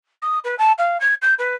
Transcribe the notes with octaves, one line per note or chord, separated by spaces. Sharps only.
D#6
B4
A5
F5
G#6
G6
B4